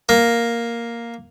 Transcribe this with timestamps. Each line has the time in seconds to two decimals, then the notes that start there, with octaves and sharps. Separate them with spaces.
0.09 A#3